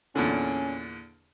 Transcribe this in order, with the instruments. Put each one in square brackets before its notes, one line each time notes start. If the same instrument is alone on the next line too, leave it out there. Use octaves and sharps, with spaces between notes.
[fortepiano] E2 A#2 D3 [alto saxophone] C#4